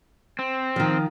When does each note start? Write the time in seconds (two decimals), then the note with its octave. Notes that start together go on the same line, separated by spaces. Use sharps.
0.39 C4
0.76 D#3 F3